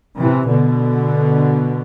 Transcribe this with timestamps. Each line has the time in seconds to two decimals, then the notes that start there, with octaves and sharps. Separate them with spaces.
0.20 C3 E3
0.49 B2 D3